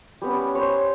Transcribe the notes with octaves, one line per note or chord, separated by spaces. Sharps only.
G3 B3 C#4
C5 C#5